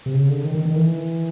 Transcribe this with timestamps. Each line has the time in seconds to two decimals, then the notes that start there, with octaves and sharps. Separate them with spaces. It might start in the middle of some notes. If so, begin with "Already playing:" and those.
0.06 C3
0.14 C#3
0.29 D3
0.45 D#3
0.55 D#3
0.65 D#3
0.76 E3